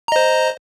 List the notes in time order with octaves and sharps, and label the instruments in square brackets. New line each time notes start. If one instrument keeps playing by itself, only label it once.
[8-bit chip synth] A#5
D#5
C5